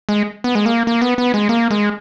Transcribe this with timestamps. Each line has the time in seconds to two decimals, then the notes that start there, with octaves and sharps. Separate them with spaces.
0.09 G#3
0.44 B3
0.55 G#3
0.66 A#3
0.87 A#3
1.02 B3
1.18 B3
1.34 G#3
1.49 A#3
1.71 G#3